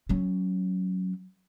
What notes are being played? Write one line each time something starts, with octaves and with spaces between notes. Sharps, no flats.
F#3 C#4